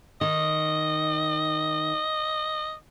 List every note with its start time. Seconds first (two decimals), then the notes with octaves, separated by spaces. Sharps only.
0.21 D#3 D#5